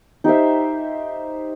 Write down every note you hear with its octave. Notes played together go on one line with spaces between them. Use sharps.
D#4 G4 C5 E5